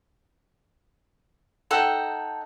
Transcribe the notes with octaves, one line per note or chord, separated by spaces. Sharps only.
D#4 A4 F#5 G5